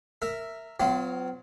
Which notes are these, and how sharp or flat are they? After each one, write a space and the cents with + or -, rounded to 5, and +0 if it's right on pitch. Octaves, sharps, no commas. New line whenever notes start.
A#4 -15 E5 +0
F#3 +0 C4 -45 F4 +0